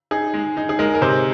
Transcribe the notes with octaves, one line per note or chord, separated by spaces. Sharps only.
D#4 G#4
G#3
D#4
G#4
G#3 A#4
A#4
C3 C5